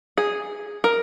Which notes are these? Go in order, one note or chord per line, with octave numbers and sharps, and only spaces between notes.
G#4
A#4